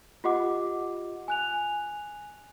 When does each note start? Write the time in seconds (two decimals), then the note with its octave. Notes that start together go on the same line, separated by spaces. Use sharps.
0.24 F4 G4 D#5 F#5 D6
1.28 G#5 F#6 F7